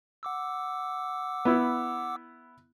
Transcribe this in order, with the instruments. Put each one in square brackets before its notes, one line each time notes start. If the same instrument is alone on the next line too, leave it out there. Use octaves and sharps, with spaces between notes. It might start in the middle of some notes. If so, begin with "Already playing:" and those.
[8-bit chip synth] F#5 D6 E6
[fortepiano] B3 E4